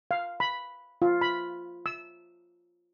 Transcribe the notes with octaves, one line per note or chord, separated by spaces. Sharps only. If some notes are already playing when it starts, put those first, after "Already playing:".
F5
B5
F4
B5
E6